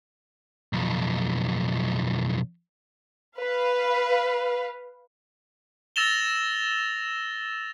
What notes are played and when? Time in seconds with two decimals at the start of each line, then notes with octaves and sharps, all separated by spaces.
0.73 B1 F2
3.38 B4 F5
5.96 E6 A6 A#6 E7 F7 G7